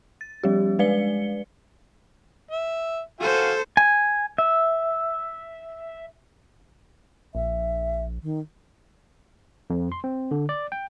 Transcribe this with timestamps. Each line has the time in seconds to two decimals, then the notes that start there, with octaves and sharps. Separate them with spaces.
0.21 A6
0.44 F3 G3 G4
0.79 G#3 B4 D5 C#7 G7
2.51 E5
3.20 F#4 A4 C5 F5 G#5
3.77 G#5
4.38 E5
7.35 A#1 E5
8.23 D#3
9.70 F2
9.92 C6
10.04 C4
10.31 D3
10.49 D5
10.72 G5